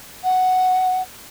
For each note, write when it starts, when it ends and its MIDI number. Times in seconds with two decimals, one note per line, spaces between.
0.24 1.01 78